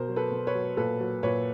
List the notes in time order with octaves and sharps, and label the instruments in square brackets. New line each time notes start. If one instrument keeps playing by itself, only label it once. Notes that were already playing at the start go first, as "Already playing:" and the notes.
Already playing: [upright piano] B2 A#4 C5
F#3
A4 B4
B2
B4 C#5
F#3
A#2 A4 B4
F#3
A#2 B4 C#5